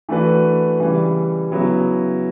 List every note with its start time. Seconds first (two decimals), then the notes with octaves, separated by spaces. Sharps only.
0.09 E3 A3 D4 F#4 B4
0.80 C#3 E3 G3
1.52 C#3 F#3 B3 E4